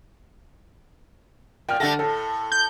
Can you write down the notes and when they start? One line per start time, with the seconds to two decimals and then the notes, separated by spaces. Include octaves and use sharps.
1.69 A#2 G5 F6
1.80 D3 G3 A3 A4 F#5 A#6
1.99 A2 A4
2.52 G6